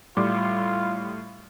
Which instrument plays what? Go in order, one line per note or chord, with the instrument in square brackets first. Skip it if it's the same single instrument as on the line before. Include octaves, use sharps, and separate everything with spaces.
[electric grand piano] A2 C6 D6 [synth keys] G3 [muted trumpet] F4